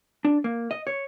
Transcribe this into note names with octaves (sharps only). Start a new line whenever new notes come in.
D4
A#3
D#5
C#5